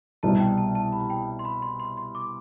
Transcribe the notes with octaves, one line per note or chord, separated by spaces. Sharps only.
C2 B2 G3 A5
G5
A5
A5
B5
G5
C6
B5
C6
C6
C6
D6